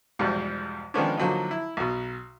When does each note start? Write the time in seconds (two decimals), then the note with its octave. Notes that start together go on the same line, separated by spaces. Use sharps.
0.19 E2 G#2 B2 F3 G3
0.94 D#3 F3 G#3 B3 C#4 D4
1.17 D3 F3 F#3 A#3 D#4
1.51 E4
1.77 B1 B2